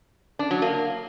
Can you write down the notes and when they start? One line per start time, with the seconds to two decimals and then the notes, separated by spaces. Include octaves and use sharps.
0.39 D4
0.51 F#3
0.62 A#3